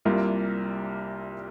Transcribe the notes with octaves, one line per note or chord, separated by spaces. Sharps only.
C2 C3 G3 A#3 F4